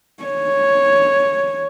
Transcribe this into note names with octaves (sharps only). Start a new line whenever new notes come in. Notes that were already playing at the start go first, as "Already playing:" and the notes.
C#5